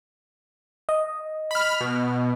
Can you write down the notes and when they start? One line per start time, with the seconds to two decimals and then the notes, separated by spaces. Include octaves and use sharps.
0.89 D#5
1.51 B5 F6
1.81 B2